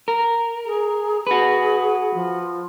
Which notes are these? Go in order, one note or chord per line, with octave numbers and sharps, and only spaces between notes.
A#4
G#4
F#4 G#4 B4
F3